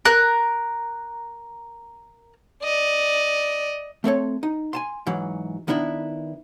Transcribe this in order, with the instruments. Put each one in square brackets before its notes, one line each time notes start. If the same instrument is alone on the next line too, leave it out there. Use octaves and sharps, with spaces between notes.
[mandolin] A#4 F#6
[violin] D5 D#5
[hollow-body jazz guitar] A3 C4 A4 C#5
D#4
G#5 A5 C6
G#2 E3 F#3
D#3 B3 D4 E4